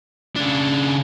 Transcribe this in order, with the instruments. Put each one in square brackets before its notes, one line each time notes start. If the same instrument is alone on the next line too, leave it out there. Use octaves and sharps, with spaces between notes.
[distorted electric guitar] C#3 D4